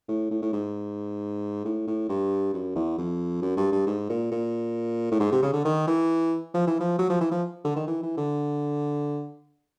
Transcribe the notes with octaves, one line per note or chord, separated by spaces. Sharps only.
A2
A2
A2
G#2
A2
A2
G2
F#2
E2
F2
F#2
G2
G2
G#2
A#2
A#2
A2
G#2
C3
C#3
D3
D#3
E3
F3
E3
F3
F#3
F3
E3
F3
D3
D#3
E3
E3
D3